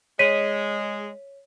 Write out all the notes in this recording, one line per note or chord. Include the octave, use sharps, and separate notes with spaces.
G#3 C#5 B6 D#7